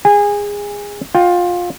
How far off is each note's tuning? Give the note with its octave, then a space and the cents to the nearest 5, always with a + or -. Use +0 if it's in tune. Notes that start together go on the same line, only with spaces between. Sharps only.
G#4 -20 G#5 -25
F4 +20 G5 +0